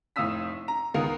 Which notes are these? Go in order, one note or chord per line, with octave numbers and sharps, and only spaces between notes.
F1 A2 F5 D#6 E6 B6
A#5
C#2 D#3 B3 A#4 F5 D#6